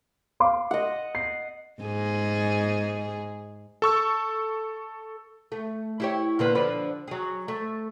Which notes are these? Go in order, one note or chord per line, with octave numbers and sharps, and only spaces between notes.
F5 C6 D6
D#5 F#5
C7
G#2 G#4
A4 C#6 E6
A3
E4 G4 C#5
A#2 D3 B3
D3 F3 B4
F#3 G#4
A3